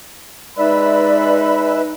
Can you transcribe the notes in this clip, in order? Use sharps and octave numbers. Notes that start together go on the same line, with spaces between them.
G#3 D#4 B4 D5 E5 B5